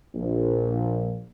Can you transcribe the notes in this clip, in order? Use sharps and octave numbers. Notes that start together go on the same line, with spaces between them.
A#1